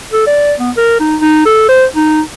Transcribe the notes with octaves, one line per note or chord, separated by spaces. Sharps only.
A4
D5
B3
A#4
D#4
D#4
A4
C5
D#4